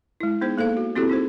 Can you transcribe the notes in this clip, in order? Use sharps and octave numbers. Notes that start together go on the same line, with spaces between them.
G#3 E4
B3 D#4 G#4 C5
A#3 A4 C5 F5
F#4
C4 E4 F#4 G4 A4
D#4 G#4 C5